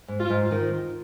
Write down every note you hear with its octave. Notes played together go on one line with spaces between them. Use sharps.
G#2
F4
G#2
D#3